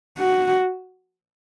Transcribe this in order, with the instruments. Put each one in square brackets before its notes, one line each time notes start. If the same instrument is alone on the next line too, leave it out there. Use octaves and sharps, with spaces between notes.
[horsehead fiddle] F#4